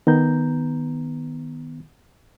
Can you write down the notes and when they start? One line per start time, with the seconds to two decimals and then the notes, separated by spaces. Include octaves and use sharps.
0.07 D#3 B3 A#5 G6